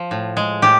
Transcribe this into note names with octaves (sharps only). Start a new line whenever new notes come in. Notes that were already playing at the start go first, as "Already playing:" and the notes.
Already playing: F3
A2
G#3
A2 G4